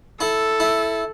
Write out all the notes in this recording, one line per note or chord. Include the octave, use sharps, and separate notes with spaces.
E4 A4
E4